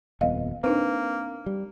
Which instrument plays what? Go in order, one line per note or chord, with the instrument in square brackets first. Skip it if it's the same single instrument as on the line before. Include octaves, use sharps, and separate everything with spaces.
[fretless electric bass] D#1 F2 B3 [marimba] D#5 F5
[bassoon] A#3 [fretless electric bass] C4 [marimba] D4 D#4 B4
[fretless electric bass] G3